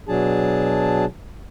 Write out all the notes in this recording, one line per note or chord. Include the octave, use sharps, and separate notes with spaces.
B2 F#3 D4 G#4 A5